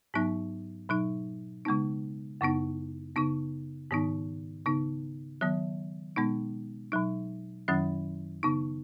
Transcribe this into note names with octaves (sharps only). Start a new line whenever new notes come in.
G#2 F#3 B3 D#4
B2 F#3 D#4
C#3 G#3 B3 D#4
F#2 C#3 B3 D#4
C#3 B3 D#4
G#2 D#3 B3 D#4
C#3 B3 D#4
D#3 F#3 B3
B2 G#3 B3 D#4
B2 F#3 D#4
F#2 D#3 F#3 C#4
C#3 B3 D#4